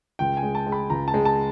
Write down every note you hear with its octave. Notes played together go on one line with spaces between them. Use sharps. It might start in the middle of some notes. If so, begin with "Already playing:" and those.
C#2 G5
G#5
G#3
A5
G#3
B5
C#2 A#5
A5
G#3
A5